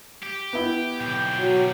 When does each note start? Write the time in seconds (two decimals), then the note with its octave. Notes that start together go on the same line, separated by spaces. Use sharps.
0.23 G4
0.53 B3 E4
1.00 B1 G4 G5
1.39 F#3